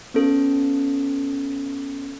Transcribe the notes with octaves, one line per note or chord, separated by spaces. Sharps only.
B3 C#4 A4